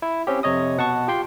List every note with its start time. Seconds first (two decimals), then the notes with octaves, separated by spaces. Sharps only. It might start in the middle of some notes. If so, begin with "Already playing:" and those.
0.02 E4
0.27 C4 C#4 G4
0.43 F2 C3 C#5 D#5 D#6
0.78 B2 F#5 A5 C#6
1.08 F4 G4 G5 C6